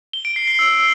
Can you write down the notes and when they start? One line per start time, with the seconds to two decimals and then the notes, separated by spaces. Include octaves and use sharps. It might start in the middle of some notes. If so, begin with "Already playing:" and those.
0.13 G7
0.25 D7
0.36 C7
0.48 C7
0.59 E6